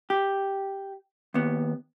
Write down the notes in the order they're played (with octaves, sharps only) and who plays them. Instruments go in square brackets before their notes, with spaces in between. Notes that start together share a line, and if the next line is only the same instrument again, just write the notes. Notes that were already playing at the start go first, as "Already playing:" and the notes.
[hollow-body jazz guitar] G4
D#2 B3